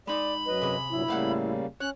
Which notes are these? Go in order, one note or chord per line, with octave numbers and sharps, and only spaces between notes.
G#3 D#4 D5 B5
F#2 F#3 B4 D#5
C3 G#4
G2 A#2 F#3 E4
A2 C#3 G3 A#3 F5 F#5
C#4 C#5 F#6